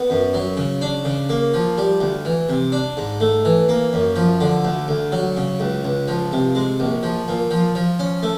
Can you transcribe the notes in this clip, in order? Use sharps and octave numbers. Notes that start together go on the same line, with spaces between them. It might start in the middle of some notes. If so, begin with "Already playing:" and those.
Already playing: B3
F#2
F#3
C#3
D4
C#3
A#3
F3
G3
D2
E3
C3
D4
G#2
A3
E3
A#3
F#2
F3
D3
D2
D2
F#3
C#3
C#2
C#2
F3
C3
G#3
A#1
F3
A#2
F3
F3
C#4
A3